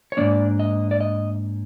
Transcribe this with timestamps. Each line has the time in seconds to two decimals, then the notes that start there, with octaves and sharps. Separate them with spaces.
0.12 C#5
0.17 G#2 F3 A#3 D4 D5
0.60 D#5
0.91 D5
1.01 D#5